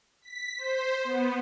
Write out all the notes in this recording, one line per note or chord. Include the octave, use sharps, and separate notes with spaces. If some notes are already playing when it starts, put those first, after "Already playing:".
B6
C5
B3